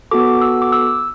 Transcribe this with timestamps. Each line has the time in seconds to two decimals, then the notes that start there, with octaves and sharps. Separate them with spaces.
0.11 B3 F#4 A4 D6
0.42 E6
0.62 D6
0.72 E6